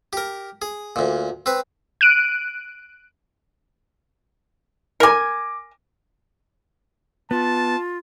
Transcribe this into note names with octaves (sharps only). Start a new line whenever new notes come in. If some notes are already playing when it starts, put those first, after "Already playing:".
G4 A#4
G#4
D2 A#2
C4 B4
F#6 D7 D#7
A#4 G#5 D6 A#6
B3 F4 A5